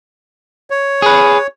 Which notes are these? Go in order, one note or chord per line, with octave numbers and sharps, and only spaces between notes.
C#5
G#4 B4